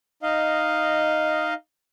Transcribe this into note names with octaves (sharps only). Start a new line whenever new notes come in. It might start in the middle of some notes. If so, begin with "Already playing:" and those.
D#4 D#5 F5